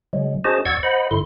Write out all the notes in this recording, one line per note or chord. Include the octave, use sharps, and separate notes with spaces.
C#3 F#3 G#3
C#4 F#4 G#4 C5 D#5 A5
E2 D5 F#5 C#6 E6 G#6
C5 D#5 F#5 B5
G2 D3 E4 C6